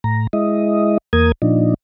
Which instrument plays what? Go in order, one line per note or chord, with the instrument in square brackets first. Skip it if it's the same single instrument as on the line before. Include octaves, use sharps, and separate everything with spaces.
[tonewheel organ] A2 A#5
G#3 E4 D#5
E2 A#3 A#4 D#6 G#6
A#2 F3 D4 D#4